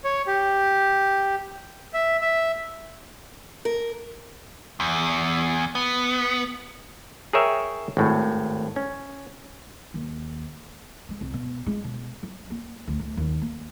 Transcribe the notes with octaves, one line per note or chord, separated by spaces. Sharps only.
C#5
G4
E5
E5
A#4
E2
B3
G#4 A#4 C#5 E5 G5
G#1 A2
C#4
D#2
G#3
C2
B2
G#3
B2
F#3
A#3
D2
A2
D#2
A#3